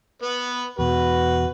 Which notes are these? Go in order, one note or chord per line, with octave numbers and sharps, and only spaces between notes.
B3 B4
E2 B2 F#4 B4